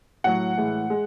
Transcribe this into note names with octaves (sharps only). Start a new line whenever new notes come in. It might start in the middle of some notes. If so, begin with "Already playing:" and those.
A2 F#3 F#5
A2 E3 G#3
G#3